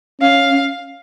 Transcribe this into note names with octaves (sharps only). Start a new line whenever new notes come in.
C#4 F5